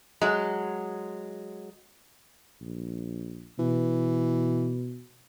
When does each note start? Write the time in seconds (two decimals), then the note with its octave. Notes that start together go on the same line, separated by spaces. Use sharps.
0.22 F#3 G#3
2.61 A#1
3.59 B2 E3